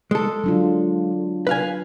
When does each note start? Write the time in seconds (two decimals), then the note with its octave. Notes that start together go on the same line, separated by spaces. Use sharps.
0.11 G#3 A4
0.44 F#3 D4 F4
1.47 B4 F5 G#5